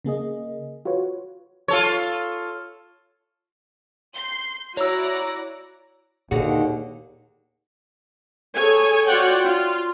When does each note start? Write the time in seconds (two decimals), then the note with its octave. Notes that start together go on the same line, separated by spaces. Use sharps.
0.04 C#3 A#3 G#4 D#5
0.85 F4 F#4 B4 C#5
1.68 F4 A4 C#5
4.14 C6 G6 C7
4.77 E4 F#4 C#5 D5 A#5 E6
6.31 D#2 A#2 D3 D#4 F#4 G#4
8.54 G#4 A4 C#5 G#5
9.06 F4 F#4 C#5 D5 F#5 G5
9.45 F4